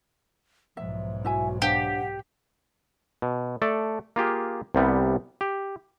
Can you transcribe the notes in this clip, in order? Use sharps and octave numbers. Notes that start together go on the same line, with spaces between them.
B1 G#2 F3 E5
E4 F#4 E5 G#5
D4 G4 C5 F5 F#5
B2
A3 A4 D5
A#3 F4 G4 G#4
C2 C3 G3 B3
G4